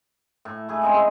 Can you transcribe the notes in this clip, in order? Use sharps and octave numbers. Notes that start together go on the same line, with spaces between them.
A2
A3 E4 G#4
C#3 G#3 C4 D#4